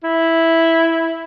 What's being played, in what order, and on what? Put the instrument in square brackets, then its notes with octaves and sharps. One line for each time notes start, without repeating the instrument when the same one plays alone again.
[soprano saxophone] E4